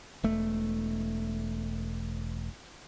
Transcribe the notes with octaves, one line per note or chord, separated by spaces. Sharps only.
E1 A3